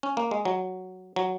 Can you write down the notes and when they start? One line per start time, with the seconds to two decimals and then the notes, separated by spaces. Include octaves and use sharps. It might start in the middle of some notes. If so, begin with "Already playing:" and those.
0.03 C#4
0.17 A#3
0.31 G#3
0.45 F#3
1.16 F#3